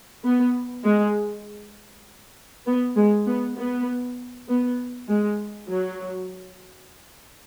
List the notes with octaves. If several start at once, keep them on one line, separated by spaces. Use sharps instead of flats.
B3
G#3
B3
G#3
B3
B3
B3
G#3
F#3